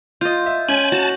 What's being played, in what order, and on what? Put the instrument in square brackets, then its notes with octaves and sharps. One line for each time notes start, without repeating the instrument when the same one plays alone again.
[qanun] F4 D#5 [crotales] G6
[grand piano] E5
[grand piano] C#4 [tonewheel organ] G#5 [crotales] F#7
[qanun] F#4 [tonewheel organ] A5